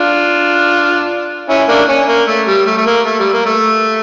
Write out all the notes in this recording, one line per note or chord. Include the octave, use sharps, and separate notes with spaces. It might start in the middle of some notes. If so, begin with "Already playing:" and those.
Already playing: D4 F4
C#4 E4
A#3 D4
C#4
A#3
A3
G3
A3
A3
A#3
A3
G3
A#3
A3